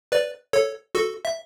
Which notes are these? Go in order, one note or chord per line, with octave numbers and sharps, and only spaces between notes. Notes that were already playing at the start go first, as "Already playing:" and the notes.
B4 D5
A4 C#5
F#4 A4
E5